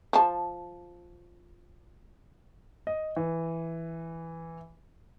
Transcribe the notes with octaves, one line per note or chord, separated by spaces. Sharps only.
F3 A5
D#5
E3